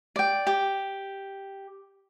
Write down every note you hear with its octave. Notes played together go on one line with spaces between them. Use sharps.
D5 G5
G4